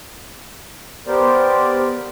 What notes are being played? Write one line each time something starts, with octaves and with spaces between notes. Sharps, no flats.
B3 G4 A#4 C5 D5